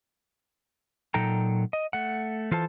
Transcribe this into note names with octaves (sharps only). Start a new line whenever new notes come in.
A#2 F#3 D#4 A4 G5 A#5
D#5
A3 F#5
E3 F4 A4 C5 A5